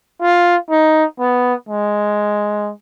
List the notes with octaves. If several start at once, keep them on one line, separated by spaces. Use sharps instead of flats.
F4
D#4
B3
G#3